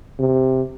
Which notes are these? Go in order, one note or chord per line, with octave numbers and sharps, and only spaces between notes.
C3